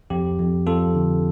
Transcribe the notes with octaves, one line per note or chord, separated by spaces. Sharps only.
F2 G4
F2
F2 F4 A4
D3